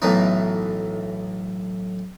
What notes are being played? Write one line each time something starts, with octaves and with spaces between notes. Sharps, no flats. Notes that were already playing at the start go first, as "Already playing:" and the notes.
B1 A2 E3 D#4